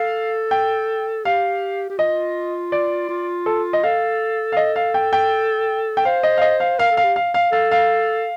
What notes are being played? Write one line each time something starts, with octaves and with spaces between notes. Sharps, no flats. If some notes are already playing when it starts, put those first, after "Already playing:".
Already playing: A4 F5
G5
G4 F5
G4
F4 D#5
D5
F4
A4
D#5
A4 F5
F5
A4 D#5
F5
G5
G5
G5
C5 F5
D#5
F5
D#5
F5
A#4 F5
A4
F5
G4
F5
F5
A4 F5
F5